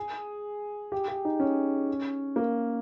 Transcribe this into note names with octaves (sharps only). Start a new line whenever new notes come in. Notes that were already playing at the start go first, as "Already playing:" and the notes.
Already playing: G#4
G4
G4
D#4
C#4
A#3